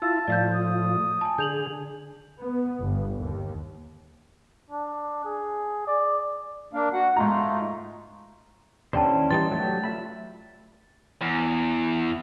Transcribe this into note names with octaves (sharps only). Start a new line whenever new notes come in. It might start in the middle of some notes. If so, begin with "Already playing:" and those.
E4 F4 A5 E6
A2 F3 D5 F5 G6
D#6
G#5 A5
D3 G#4 G6 F7 F#7
B3
G1
D#2
D4
G#4
D5
A#3 D4 F5
F#4 F#5
G#2 A3 D#4 F4 A#5
D#2 D3 C#4 E4 C5 D5 G5 A5
E3 G3 D#4 C6 A6
F#3 A3 G4
F4 E5 B5
E2